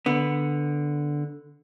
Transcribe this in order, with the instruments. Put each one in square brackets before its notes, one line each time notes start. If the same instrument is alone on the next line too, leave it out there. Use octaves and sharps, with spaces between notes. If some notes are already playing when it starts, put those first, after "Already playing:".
[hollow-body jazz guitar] D3 B3